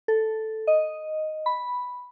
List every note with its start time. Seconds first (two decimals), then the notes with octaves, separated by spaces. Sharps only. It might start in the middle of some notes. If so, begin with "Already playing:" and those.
0.08 A4
0.67 D#5
1.46 B5